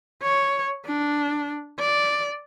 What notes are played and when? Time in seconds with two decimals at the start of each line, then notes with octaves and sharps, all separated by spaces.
0.23 C#5
0.86 D4
1.79 D5